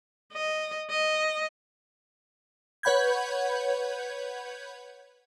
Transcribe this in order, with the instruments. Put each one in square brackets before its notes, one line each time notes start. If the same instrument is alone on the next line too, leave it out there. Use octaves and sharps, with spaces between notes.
[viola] D#5
D#5
[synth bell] B4 C#5 F#5 B5 G6 G#6